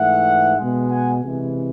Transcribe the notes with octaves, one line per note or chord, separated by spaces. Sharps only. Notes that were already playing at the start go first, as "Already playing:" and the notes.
Already playing: G#2 E3 A3 E5 F#5
B2 G#3
F#5 G#5
C3 E3 G#3